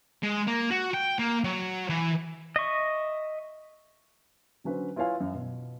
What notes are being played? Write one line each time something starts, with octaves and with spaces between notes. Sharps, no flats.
G#3
A#3
F#4
G5
A#3
F#3
E3
D#5 E5 C#6
D3 F#3 C#4 B4 C5
E4 F4 B4 C#5 F5 G#5
F#2
B2